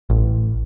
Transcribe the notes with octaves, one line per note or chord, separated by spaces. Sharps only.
A1